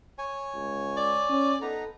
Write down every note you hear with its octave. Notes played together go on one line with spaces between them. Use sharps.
C#5 G#5
C#2
D5
C#4
B3 D#4 A4 A#5